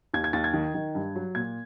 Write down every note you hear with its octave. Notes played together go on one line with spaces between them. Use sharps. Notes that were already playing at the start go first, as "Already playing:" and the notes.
D#2 G#6
G#6
D#2 A6
G#6
D#3
D#3
G2
F#3
A#2 G#6